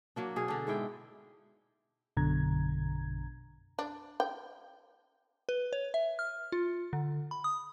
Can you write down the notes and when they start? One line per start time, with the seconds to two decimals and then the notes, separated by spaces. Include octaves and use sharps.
0.16 F#3 A#3 D4
0.36 B2 G#4
0.48 D3 D4
0.67 G#2 G#3 E4 G5
2.17 A#1 F#2 B2 D3 A#5 G#6
3.79 D4
4.20 G5
5.49 B4
5.73 C#5
5.94 E5
6.19 F6
6.52 F4
6.93 D3
7.31 B5
7.44 D#6